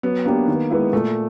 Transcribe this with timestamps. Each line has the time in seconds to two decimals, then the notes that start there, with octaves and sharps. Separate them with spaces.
0.03 F#3 B3
0.25 A#3 B3 D4 G4
0.48 D#3
0.70 G#3 B3 E4
0.93 A#2 A3